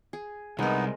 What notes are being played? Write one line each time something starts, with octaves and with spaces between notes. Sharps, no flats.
G#4
C2 G#3 B3 D#4 A#4